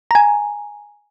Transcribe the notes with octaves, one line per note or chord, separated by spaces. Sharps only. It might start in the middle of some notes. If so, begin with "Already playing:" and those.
G#5 A#5